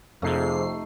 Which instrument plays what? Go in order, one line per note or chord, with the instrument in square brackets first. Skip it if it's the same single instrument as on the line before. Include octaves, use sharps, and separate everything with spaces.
[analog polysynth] F2 C3 C7 [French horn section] F3 G#4 [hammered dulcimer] A3 D#4